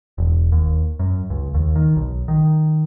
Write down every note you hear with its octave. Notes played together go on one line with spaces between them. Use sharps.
E1
D#2
F#2
C#2
D#2
D#3
B1
D#3